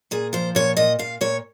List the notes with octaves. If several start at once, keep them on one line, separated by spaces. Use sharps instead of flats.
A#2 G#4
F3 C5
A#2 C#5
A#2 D#5
A#2 F5
A#2 C#5